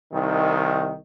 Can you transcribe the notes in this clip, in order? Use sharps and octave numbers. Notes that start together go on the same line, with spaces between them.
C2 D#3